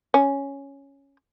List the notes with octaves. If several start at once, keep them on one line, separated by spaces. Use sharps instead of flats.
C#4